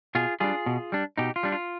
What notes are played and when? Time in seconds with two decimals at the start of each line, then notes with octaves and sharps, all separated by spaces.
0.15 B2 F4 G#4
0.40 G3 D4 F4 G#4
0.66 B2
0.92 G3 D4
1.17 B2 D#4 G4
1.36 F4
1.43 G3 D4
1.52 F4